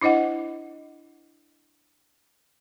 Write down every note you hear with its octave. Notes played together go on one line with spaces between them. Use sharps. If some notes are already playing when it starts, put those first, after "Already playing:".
D4 E4 C5 D#5 F#5